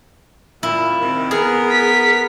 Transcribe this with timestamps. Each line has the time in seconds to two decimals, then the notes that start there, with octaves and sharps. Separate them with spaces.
0.63 A#2 E4
1.00 C3 D#3
1.31 B3 G#4 A#4
1.71 B6